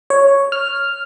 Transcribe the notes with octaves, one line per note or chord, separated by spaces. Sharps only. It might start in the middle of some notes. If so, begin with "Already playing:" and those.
C#5
F6